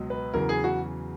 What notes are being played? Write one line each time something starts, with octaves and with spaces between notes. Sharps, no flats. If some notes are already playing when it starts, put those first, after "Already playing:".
Already playing: C#2 B2 F#3
B4
E2 C#3 F#3 A#4
G#4
F#4